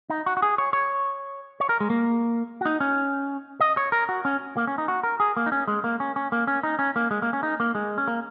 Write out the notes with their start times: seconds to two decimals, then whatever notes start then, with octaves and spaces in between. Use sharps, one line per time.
0.10 D#4
0.26 F#4
0.37 F#4
0.42 G#4
0.58 C#5
0.73 C#5
1.60 C#5
1.69 A#4
1.80 G#3
1.90 A#3
2.61 F#4
2.65 D#4
2.80 C#4
3.60 D#5
3.77 C#5
3.92 A#4
4.09 F#4
4.25 C#4
4.57 A#3
4.67 C#4
4.78 D#4
4.88 F#4
5.03 A#4
5.20 G#4
5.37 A#3
5.46 D#4
5.52 C#4
5.68 G#3
5.84 A#3
6.00 C#4
6.16 C#4
6.32 A#3
6.47 C#4
6.63 D#4
6.79 C#4
6.96 A#3
7.11 G#3
7.22 A#3
7.33 C#4
7.43 D#4
7.60 A#3
7.75 G#3
7.98 C#4
8.08 A#3